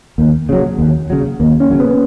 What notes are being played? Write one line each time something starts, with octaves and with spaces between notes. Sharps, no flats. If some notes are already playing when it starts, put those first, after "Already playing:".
D#2 A#3
C#3 F#3
D#2
C#3 F#3
D#2 A#3
C#4
C#3 F#3
B3